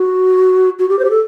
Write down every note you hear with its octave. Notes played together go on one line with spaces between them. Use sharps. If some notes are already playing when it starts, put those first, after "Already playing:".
Already playing: F#4
F#4
G4
C5
G4
A4